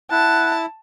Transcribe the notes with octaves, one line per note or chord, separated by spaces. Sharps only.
E4 F#5 A5